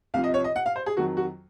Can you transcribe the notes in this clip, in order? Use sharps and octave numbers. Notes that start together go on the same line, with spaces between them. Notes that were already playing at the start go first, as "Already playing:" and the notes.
C2 C3 F3 F5
D#5
C#5
D#5
F#5
F5
C5
G#4
F2 D#3 F#3 F#4
F#4